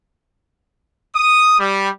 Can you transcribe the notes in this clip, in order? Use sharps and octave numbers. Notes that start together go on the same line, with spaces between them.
D#6
G3